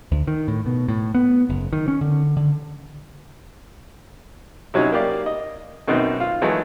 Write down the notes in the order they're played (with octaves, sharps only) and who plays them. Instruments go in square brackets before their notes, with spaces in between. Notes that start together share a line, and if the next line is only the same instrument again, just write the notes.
[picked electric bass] D2
D#3
A2
B2
A2
B3
F#1
D#3
C#4
D3
D3
[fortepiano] C3 F#3 C#4 D#4 E4
A#3 G4 D5 F5
D#5
F#2 B2 D#3 C4 D#5 F#6
F4
D#3 E3 F#3 G#3 A3 F#4